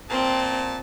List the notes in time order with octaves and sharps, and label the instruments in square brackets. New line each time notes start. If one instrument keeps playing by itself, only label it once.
[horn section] A#2 A5 [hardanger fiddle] C4